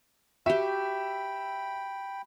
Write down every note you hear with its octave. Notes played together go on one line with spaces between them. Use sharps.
F#4 G4 E5 G5 B5